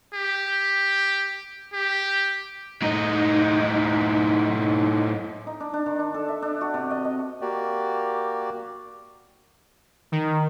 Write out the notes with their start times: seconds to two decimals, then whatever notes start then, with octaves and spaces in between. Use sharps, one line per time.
0.14 G4
1.73 G4
2.82 A2 D#4
5.47 D#4
5.60 D4
5.74 D4
5.86 D#3
5.99 D4
6.14 A4
6.28 E5
6.42 D4
6.61 F#4
6.74 C3
6.90 D#5
7.05 D#5
7.41 A#3 F#4 G4 D5
10.12 D#3